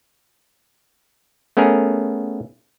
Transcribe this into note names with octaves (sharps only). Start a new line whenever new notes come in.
A3 B3 C#4 G#4 A#4